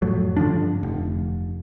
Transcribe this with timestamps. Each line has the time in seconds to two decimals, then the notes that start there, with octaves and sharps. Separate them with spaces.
0.02 F2 A2 F#3
0.37 G2 D3 F3 D4
0.83 F1